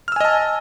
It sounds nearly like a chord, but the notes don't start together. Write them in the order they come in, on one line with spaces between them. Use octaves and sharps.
F6 E6 G#5 D#5 A5